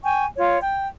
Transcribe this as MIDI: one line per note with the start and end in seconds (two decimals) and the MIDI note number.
0.03 0.26 79
0.03 0.26 80
0.03 0.26 85
0.36 0.57 65
0.36 0.57 73
0.62 0.86 79